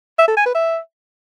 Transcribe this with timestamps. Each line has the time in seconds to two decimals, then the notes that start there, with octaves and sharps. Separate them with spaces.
0.19 E5
0.28 A4
0.37 G#5
0.46 B4
0.55 E5